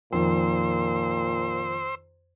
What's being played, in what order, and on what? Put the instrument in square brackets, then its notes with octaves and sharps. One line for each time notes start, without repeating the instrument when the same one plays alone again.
[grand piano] F2 D#3 F3 [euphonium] A#2 [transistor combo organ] C5 C6 E6